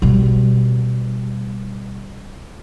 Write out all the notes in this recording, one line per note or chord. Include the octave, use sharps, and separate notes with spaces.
B2 G3